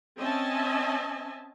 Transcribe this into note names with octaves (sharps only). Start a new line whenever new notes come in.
C4 C#4 D#5 E5 G#5 A5